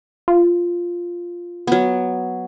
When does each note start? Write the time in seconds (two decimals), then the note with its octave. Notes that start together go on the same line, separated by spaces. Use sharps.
0.28 F4
1.67 F#3 B3